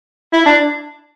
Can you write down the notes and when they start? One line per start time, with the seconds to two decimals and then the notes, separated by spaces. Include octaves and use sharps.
0.33 E4
0.46 D4